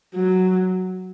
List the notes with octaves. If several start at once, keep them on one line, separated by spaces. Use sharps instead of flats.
F#3